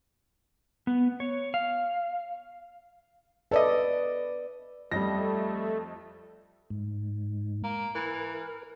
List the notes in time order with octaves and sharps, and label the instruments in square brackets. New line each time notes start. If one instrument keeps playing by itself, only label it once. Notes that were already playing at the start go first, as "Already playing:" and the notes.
[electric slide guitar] B3
C#5
F5
[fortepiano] A4 D#5 [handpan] B4 D5
[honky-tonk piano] F2 D#5 [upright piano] G3 A#6 [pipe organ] A3
[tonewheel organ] G#2
[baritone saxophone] A#3
[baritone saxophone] E3 [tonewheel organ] A#4